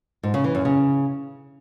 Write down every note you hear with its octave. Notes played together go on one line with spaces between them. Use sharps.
G#2
C#3
E3
F#2
C#3